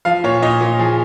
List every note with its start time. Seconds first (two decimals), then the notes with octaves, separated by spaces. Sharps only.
0.05 F3 F5
0.24 A#2 C#5
0.42 A#2 D#5
0.61 A#2
0.79 F3 G#4